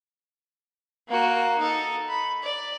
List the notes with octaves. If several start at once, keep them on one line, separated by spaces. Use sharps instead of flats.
A#3 F#4
D#4 A4
B5
D5